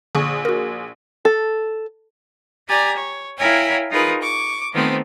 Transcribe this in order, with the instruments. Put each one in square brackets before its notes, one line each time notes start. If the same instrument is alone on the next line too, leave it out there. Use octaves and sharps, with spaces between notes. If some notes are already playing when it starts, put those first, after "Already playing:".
[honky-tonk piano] A#1 G#4 D#6 [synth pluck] D3 C#6
[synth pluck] F#4 A#4
[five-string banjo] A4
[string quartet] G4 D5 G#5 A#5
C#5
E4 A#4 C#5 F5 G5 G#5
D#4 F4 G#4 A#4 B4
C#6 D6
D#3 F3 A3 B3 C4